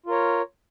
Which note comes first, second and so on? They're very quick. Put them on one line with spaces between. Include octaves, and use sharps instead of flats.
F4 A#4 C#5